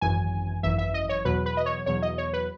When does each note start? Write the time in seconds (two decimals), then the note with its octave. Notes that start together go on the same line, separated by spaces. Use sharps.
0.01 G#1 F#2 E3 G#5
0.63 G#1 F#2 E3 E5
0.78 E5
0.94 D#5
1.09 C#5
1.25 E2 B2 F#3 B4
1.46 B4
1.57 D#5
1.66 C#5
1.86 E2 B2 F#3 C#5
2.02 D#5
2.18 C#5
2.33 B4